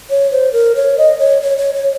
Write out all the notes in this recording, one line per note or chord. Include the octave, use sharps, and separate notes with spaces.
C#5
C5
A#4
C#5
D#5
C#5
C#5
C#5
C#5